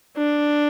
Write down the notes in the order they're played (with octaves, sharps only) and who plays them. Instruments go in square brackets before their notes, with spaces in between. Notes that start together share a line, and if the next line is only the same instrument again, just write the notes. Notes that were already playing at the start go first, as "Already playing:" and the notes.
[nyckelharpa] D4